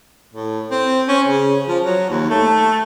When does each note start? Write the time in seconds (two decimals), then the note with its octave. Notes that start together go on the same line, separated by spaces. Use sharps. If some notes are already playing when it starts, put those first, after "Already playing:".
0.33 A2
0.71 C4
1.08 C#4
1.27 C#3
1.68 F3
1.84 F#3
2.10 D#2
2.30 A3